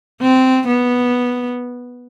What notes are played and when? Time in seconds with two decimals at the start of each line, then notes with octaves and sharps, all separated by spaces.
0.22 C4
0.67 B3